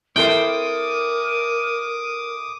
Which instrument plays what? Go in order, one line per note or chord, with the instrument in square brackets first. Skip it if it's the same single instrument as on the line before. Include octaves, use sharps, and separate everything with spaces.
[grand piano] C4 E4 A4 [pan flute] A#4 [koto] C5 G5 [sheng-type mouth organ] D6 D#6